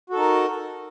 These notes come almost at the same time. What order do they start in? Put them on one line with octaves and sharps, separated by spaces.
F#4 A4 D#4 A#4